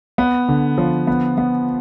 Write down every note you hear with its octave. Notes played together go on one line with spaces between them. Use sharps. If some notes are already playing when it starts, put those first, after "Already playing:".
B3
D3
F3
B3
B3